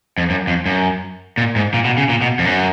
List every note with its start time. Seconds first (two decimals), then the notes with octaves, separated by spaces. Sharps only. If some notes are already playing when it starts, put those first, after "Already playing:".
0.18 F2
0.30 F#2
0.47 F2
0.66 F#2
1.37 A#2
1.56 G#2
1.74 A#2
1.85 B2
1.97 C#3
2.09 A#2
2.22 B2
2.39 F2
2.45 F#2